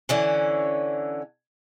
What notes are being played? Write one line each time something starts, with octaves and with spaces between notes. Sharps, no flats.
D3 E3 C#4